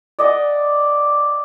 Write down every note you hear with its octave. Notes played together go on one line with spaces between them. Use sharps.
D5 D#5 F#5 G#5